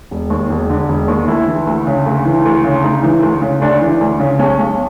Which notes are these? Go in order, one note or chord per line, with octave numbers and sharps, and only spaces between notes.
E1
D#2
E1
D3
E1
D#2
D2 E4
E3
D2
C#3
D2
E3
D2
C#3
D2 D#4
E3
D2
C#3
D2 D4
E3
D2
C#3
B1 C#4
B1